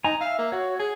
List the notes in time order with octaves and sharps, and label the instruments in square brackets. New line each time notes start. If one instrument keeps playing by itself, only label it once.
[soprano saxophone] D#4 [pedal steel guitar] G#5 A#5
[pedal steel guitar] E5 [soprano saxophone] F5
[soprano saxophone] A#3
[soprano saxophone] F#4 [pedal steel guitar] C#5
[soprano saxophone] G#4 [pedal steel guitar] G#5